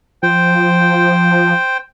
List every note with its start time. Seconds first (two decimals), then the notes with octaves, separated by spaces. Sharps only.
0.23 F3 C5 G5